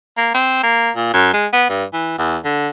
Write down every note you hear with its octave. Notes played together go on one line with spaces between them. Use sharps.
A#3
C4
A#3
A#2
F#2
G#3
B3
G2
E3
E2
D3